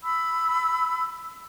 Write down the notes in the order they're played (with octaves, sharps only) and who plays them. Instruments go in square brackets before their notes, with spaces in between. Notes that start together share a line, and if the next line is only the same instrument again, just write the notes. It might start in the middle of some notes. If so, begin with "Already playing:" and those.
[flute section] B5 E6